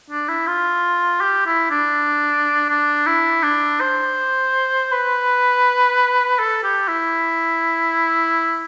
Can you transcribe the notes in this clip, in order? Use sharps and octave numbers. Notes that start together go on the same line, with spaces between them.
D4
E4
F4
G4
E4
D4
D4
E4
D4
C5
B4
A4
G4
E4